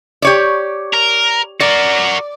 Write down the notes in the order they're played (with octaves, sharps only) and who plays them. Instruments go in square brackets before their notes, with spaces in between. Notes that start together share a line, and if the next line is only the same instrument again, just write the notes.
[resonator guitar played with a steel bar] G4 C#5 D5
[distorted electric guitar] A#4
[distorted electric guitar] F#4 A#4 [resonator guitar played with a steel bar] D5